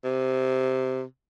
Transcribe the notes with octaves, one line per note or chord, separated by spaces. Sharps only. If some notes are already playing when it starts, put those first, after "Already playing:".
C3